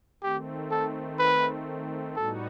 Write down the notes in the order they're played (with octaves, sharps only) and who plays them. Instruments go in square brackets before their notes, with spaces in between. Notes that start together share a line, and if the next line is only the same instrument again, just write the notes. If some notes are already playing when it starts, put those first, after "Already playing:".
[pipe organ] D#3 A3 C4 [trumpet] G4
[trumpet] A4
B4
[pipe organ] A2 G3 B3 D#4 F#4 [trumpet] A4